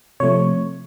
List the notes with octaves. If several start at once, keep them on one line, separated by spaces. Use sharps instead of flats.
C3 F3 A3 C#5